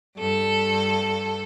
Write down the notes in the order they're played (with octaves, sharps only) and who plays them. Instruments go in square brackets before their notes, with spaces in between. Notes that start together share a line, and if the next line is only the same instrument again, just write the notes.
[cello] G2 A4